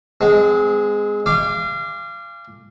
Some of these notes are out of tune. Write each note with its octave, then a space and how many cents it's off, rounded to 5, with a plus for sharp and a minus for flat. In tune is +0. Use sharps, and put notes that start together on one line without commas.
G#3 +0 C4 -35
F5 -30 G#5 -40 D6 +0